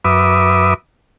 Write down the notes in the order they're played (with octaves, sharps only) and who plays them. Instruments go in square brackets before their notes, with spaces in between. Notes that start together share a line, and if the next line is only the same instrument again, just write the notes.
[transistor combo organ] F#2 B4 E5 D6 D#6